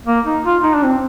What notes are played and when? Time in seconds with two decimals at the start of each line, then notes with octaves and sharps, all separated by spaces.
0.07 A#3
0.26 D#4
0.45 F4
0.63 D#4
0.74 D4
0.83 C4